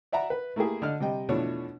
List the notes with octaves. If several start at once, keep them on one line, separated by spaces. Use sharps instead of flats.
D5 E5 F#5 A#5
B4
A3 A#3 E4 G4 G#4
D3 D4 D#5 F6
C3 G3 D#5 G5
E2 B2 F3 A3 D4 C#5